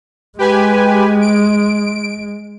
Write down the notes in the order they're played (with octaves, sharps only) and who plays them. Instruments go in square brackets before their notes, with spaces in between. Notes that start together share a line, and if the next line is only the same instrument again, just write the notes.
[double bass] G#3 [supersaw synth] G4 B4 G#5
[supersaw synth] D7